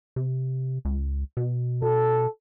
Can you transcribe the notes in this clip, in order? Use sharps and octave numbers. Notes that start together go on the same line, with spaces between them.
C3
C#2
B2
B2 A4